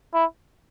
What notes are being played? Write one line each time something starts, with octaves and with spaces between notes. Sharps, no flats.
E4